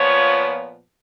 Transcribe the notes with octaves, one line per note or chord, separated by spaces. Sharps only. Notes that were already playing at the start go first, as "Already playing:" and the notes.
Already playing: A#2 F3 B3 C#5